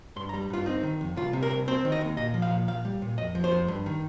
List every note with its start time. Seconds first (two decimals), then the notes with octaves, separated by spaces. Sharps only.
0.16 G2 C6
0.29 A#5
0.34 G3
0.50 G2 F4
0.66 C4 D#4
0.83 D#3
1.01 F2
1.16 C2 F4
1.33 C3
1.43 A#4
1.51 C2
1.68 C4 C5
1.85 D#3
1.92 D#5
2.01 D#2
2.17 A#2 D#5
2.34 F3
2.42 F5
2.51 A#2
2.68 A#2 F5
2.85 G3
3.02 A#2
3.18 F2 D#5
3.35 F3
3.44 C5
3.52 F2
3.68 G2
3.86 D#3